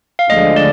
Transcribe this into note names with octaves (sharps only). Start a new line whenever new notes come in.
F5
D2 D3 F3 G#3 D#5
D5